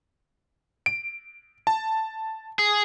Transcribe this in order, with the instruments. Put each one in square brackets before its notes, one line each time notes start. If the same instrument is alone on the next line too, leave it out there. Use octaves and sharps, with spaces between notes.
[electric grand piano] D7
A5
[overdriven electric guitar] G#4